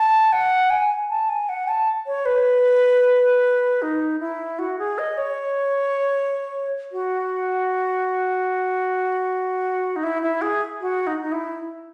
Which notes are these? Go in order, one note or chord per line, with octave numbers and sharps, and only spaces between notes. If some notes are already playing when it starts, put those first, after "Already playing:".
Already playing: A5
F#5
G#5
A5
G#5
F#5
A5
C#5
B4
D#4
E4
F#4
G#4
D#5
C#5
F#4
D#4
E4
E4
G#4
F#4
D#4
D#4
E4